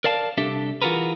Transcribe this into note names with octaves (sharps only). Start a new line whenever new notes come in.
A#4 D5 F5 A5
C2 D4 G4 A4 E5
E3 F4 F#4 G#4 A#4 B4